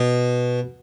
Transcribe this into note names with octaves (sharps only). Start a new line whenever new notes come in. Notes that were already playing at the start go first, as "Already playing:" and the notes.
Already playing: B2